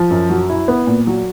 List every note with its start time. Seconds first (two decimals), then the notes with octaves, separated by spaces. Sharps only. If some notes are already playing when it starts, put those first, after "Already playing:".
Already playing: F3
0.11 F#2
0.30 F#3
0.50 E4
0.68 B3
0.87 A#2
1.07 F#3